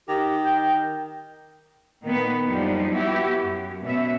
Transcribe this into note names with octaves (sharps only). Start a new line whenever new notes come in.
D#3 G4
G5
A#2 D#3 A#3 B3
F#2 F3 G3 D4 D#4
B3 E4 F#4 G4 E5
F#2
B2 C#4 E5